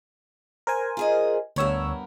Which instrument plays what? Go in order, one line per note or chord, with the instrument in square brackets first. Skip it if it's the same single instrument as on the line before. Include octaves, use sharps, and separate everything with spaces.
[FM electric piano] A#4 C5 G#5
[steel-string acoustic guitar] F4 G#4 D#5
[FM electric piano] D2 C#5 E6 [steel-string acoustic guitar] G2 B3 A#4